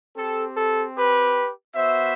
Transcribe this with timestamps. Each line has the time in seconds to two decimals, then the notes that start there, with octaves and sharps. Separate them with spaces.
0.17 C4 G4 A4
0.56 A4
0.96 G4 B4
1.75 B3 F#4 C5 E5